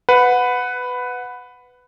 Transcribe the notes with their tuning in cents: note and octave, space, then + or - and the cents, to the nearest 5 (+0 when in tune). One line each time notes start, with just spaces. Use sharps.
B4 +10 F#5 -15